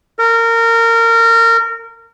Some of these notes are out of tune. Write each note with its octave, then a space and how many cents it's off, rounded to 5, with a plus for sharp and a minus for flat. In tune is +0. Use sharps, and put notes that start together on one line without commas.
A#4 -25